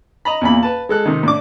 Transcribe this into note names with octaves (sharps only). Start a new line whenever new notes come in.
D#5 A#5 B5
E2 A#2 B5
B4 A5
G#3 A4 F#6
C3 D#3
A2 D4 D6